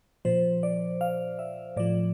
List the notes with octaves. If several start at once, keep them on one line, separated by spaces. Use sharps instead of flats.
A#2 F3 C5
D5
F5
E5
A2 F3 D5